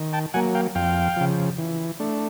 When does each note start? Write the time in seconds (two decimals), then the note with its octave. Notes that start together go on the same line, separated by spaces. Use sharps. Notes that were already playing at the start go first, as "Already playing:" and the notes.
Already playing: D#3
0.13 G5 A5
0.34 F#3 A#3 F#5 G#5
0.55 F5 G5
0.75 F2 F5 G5
1.17 C#3 F3
1.58 E3
2.00 A3 D4